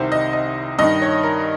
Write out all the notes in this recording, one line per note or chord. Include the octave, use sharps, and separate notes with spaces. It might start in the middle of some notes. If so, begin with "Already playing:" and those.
Already playing: C2 C3 D#3 C5
D#5
D#5
G2 D#3 D#5
C#5
A#4